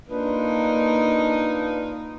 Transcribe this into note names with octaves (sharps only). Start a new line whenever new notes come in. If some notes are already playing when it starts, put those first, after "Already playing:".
A#3 D4 D#4 F4 B4